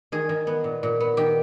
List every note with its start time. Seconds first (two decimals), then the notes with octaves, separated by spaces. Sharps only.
0.12 D#3 G#4
0.29 D#3
0.47 B3
0.64 A#2
0.83 A#2
1.00 B3
1.17 D#3 G4